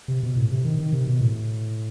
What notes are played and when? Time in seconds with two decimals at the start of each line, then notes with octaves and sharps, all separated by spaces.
0.08 C3
0.23 B2
0.37 A2
0.51 C3
0.65 D#3
0.79 D#3
0.93 C3
1.07 B2
1.21 A2